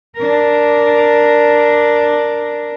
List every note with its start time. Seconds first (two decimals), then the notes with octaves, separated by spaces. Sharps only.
0.17 D4 A#4